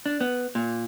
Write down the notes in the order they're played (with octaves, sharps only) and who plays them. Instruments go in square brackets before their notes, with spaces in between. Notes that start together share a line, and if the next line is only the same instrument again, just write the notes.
[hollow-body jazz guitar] D4
B3
A#2